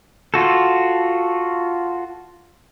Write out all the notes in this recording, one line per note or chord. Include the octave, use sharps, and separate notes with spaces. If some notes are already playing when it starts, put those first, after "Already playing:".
F4 F#4 A4